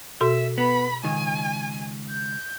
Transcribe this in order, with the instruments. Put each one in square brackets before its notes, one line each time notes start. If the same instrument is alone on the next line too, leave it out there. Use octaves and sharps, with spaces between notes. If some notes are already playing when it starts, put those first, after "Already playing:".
[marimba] B2 F#4 A4 [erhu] E5
[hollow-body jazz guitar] B3 [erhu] B5
[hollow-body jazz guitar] C#2 D#3 [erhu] G#5
[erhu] G6